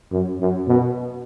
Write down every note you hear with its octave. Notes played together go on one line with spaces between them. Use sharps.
F#2
F#2
B2